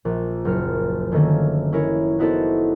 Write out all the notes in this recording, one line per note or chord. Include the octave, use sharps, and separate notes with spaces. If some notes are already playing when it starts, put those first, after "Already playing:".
A#1
F#1 A#4 F6 C#7
D3 D#3 A3 A#3 C#4
C#4 E4 A#4 C#5
B3 D#4 E4 F#4 A4 C5